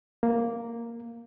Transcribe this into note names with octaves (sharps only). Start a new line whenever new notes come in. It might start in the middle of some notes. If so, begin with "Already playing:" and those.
A#3